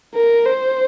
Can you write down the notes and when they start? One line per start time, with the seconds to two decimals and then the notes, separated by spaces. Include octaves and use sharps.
0.15 A#4
0.45 C5